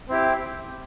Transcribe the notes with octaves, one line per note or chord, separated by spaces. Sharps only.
C4 E4 G4